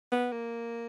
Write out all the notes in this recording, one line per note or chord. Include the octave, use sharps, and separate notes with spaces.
B3
A#3